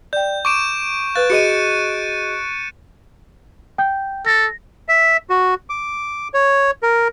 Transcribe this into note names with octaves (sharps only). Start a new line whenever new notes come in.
D5 G5 G6
C#6 D6 D7 E7
B4 F5 F#6 A6
F#4 G#4 D#5 C#7 D#7
G5 G6
A4 A#6
E5
F#4
D6
C#5
A#4